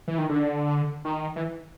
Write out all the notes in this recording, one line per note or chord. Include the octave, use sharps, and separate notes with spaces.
E3
D#3
D3
D#3
E3